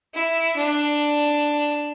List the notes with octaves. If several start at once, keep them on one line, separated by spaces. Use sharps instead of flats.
E4
D4